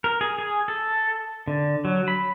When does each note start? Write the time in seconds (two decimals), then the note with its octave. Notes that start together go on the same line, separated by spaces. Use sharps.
0.04 A#4
0.21 G#4
0.39 G#4
0.68 A4
1.48 D3
1.85 F#3
2.08 B5